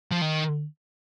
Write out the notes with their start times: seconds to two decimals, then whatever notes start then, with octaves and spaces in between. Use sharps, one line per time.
0.11 F3
0.21 D#3